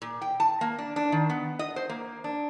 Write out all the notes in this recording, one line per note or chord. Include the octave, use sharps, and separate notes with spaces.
A#2
G5
A5
A#3
D4
D4
D#3
B3
D#5
C5
A#3
D4